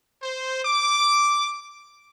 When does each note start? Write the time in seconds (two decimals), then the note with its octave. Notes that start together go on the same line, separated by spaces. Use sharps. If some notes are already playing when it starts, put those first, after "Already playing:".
0.22 C5
0.65 D6